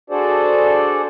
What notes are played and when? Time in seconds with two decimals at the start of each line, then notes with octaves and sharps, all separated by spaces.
0.10 D4 F#4 G#4 A4 C5 D5